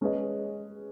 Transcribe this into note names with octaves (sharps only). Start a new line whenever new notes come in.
G#3 C#4 G#4 B4 D#5